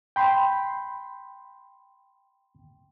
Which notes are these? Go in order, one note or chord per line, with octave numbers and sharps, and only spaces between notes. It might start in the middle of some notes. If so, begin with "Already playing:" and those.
G5 B5 C6